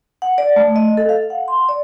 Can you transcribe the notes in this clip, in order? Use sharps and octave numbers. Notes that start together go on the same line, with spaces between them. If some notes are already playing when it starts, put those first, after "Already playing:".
F#5
D5
A3
D#5
A4
F5
F#5
C6
D5